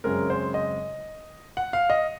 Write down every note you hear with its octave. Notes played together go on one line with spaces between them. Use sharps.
F#2 C#3 G#3 C4 A#4
C5
D#5
F#5
F5
D#5